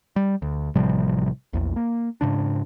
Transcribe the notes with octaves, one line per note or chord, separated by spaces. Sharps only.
G3
D2
A1 C3 F3 G3
A#1 E2
A#3
G#2 C#3 D4